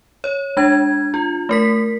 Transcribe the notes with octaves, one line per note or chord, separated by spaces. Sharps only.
C#5
G#3 D4 G#6
F4
A3 A#4 B6